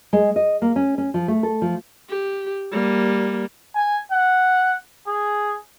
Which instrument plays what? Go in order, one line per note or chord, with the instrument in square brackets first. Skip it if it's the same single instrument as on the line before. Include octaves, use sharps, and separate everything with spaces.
[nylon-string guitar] G#3
D#5
A#3
C#4
C#4
F3
A3
A4
F3
[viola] G4
G3 A#3
[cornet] G#5
F#5
G#4